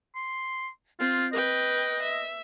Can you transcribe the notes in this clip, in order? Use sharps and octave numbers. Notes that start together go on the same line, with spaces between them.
C6
C4 F4
B4 D#5 G5
E5